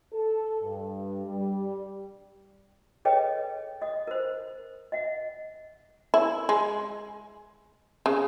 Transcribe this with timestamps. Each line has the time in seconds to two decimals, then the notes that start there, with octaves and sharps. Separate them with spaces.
0.13 A4
0.61 G2
1.25 G3
3.05 G#4 A4 B4 C#5 D#5 G5
3.82 D#5 D#6
4.08 A#4 C5
4.92 D#5 E5 F#5
6.14 E4
6.49 G#3
8.06 C#3